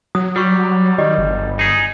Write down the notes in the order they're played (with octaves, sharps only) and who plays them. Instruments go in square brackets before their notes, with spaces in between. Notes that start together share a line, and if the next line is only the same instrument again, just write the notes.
[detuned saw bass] F#3 [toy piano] D#6
[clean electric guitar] G3 [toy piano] F#4 C#6
[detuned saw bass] D#3 [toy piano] G4 D5 D#5
[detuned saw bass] G1
[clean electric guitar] D#4 G#4